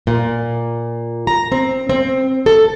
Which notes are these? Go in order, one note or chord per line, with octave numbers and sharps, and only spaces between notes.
A#2
A#5
C4
C4
A4